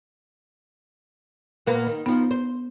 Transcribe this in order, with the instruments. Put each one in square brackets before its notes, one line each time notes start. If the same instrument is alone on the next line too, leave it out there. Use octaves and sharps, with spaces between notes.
[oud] A#2 A#3 B3
D#3
[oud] D#3 F3 [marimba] B3
[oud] C5